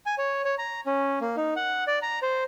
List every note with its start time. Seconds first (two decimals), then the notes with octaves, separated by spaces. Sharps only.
0.06 G#5
0.18 C#5
0.45 C#5
0.58 A#5
0.86 C#4
1.21 A#3
1.37 D#4
1.56 F#5
1.87 D5
2.02 A#5
2.22 C5